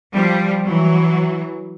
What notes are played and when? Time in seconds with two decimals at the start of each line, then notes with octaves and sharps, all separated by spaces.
0.13 F3 G3
0.65 E3 F#3